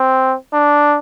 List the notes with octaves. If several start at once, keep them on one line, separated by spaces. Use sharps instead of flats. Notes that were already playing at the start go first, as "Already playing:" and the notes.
Already playing: C4
D4